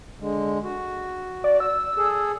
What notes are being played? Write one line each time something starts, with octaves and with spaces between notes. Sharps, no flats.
D3 G#3
F#4
D5
E6
G#4 A4